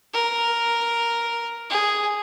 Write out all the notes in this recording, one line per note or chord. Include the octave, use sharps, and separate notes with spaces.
A#4
G#4